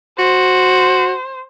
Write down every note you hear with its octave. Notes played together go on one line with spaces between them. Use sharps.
F#4 C5